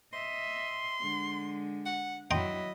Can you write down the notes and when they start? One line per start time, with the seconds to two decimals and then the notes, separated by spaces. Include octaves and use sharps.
0.13 D#5 E5 C6
1.00 D3 G#3
1.85 F#5
2.31 F#3 E4 D#5 G5 A#5 C6